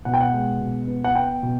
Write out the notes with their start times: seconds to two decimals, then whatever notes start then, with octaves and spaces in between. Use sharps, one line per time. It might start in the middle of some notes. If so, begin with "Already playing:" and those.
0.05 B2 F#5
0.14 G5
0.21 F#5
0.33 G#3
0.61 B2
0.87 B3
1.04 F#5
1.15 B3 G5
1.43 B2